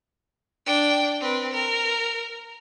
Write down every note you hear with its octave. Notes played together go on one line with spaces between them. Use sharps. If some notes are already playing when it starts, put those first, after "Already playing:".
D4 G5
C4 B4
A#4